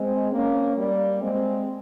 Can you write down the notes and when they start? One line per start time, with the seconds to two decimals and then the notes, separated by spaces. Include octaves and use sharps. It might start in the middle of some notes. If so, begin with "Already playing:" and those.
Already playing: G#3 C4
0.31 A#3 C#4
0.76 G3 A#3
1.21 G#3 C4